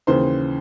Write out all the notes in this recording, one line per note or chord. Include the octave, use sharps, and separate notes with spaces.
D#2 C#3 E3 C5